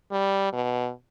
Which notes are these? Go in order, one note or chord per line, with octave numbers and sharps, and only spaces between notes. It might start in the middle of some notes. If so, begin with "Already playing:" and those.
G3
B2